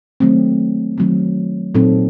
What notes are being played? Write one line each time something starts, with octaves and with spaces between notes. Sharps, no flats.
D#3 F#3 A3 C4
D#3 F#3 A3 C4
A#2 F#3 C4 D#4 A4